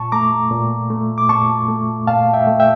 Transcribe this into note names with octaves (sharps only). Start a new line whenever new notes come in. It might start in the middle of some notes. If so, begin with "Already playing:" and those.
Already playing: A#2 A5 C#6
A3 A#5 D6
A#2
A3
D6
A#2 A5 C#6
A3
A#2 F5 A5
E5 G5
A3
E5 G5